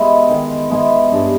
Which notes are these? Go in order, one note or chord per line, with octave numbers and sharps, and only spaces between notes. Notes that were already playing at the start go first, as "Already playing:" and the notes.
Already playing: G#3 B3 E4
D#3
G#3 B3 E4
G2